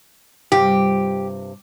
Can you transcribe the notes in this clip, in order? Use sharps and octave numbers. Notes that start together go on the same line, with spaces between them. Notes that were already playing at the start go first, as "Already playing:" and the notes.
G2 C3 F4 G4